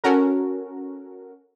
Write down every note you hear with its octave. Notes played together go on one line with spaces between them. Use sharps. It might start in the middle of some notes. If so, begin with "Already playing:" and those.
C#4 F#4 A4 A#4